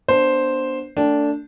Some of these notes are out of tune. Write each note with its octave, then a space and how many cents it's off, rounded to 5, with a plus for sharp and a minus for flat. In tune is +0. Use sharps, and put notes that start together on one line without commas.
B3 -20 D4 +0 C5 +0
A3 +30 D4 -10 G5 +0